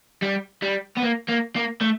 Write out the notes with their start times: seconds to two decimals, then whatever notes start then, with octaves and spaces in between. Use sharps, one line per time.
0.22 G3
0.62 G3
0.97 B3
1.02 A#3
1.28 A#3
1.56 A#3
1.81 A3